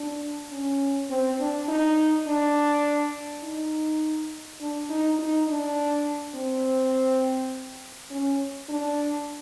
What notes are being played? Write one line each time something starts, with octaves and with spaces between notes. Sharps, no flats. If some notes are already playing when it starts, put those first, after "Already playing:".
Already playing: D4
C#4
C4
D4
D#4
D4
D#4
D4
D#4
D#4
D4
C4
C#4
D4